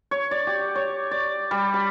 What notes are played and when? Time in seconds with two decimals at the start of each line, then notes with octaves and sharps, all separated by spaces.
0.11 C#5
0.31 D5
0.47 G4
0.75 C#5
1.11 D5
1.51 G3
1.74 B5